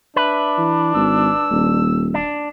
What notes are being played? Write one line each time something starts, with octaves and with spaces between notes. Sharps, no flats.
D4 B4 E5
E3
G#1 E6
D#1
D4